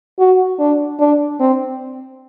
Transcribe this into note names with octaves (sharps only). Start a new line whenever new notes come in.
F#4
D4
D4
C4